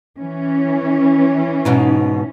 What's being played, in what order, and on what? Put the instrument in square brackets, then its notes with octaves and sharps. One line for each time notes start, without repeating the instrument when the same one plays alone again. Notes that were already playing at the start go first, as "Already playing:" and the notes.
[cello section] E3 C#4
[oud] G#2 B2 D#4